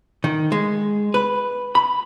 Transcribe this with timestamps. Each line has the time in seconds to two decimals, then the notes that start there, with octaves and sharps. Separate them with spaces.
0.24 D#3
0.52 G#3
1.14 B4
1.75 B5